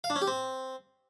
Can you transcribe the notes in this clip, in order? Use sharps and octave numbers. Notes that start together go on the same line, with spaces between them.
F5
D4
C#4
G4
C4